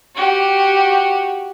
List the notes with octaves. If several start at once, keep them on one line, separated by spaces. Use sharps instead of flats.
F#4 G4